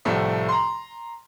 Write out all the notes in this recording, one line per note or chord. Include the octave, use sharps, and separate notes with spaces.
C2 A2 F3 A3
A#5 C6